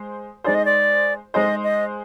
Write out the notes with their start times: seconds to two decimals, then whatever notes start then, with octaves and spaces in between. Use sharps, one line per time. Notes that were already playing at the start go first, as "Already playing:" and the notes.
Already playing: G#3 G#4 C5
0.44 G#3 D#4 G#4 C5 D5
0.55 D#5
0.65 D5
1.34 G#3 D#4 G#4 C5 D#5
1.64 D#5